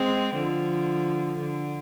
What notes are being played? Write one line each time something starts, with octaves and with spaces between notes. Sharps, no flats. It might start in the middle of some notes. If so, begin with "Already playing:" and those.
Already playing: G#3 C4
D3 F3
D3